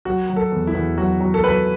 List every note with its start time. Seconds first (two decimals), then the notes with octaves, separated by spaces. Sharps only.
0.05 F#3 F#4
0.29 F#3
0.36 A4
0.52 E2
0.67 E4
0.75 E2
0.97 F#3 F#4
1.21 F#3
1.34 A4
1.44 F#3 B4